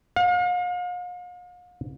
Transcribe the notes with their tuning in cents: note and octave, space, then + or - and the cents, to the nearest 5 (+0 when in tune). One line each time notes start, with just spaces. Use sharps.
F5 +40